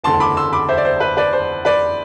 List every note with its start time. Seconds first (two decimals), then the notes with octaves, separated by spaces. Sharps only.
0.04 F#1 E2 D3 A3 A5 C6
0.20 B5 D6
0.37 C6 E6
0.53 B5 D6
0.69 C5 E5
0.77 D5
0.85 C5
1.00 B4
1.17 B4 D5
1.33 C5
1.65 B4 D5